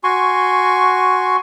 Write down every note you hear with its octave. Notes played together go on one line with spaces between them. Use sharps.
F#4 G#5 C6 C#6